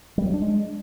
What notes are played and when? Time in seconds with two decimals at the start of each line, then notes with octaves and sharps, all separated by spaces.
0.18 G3
0.26 F#3
0.34 D4
0.42 G#3